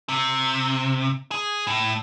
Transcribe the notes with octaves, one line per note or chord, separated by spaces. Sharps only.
C3
G#4
A2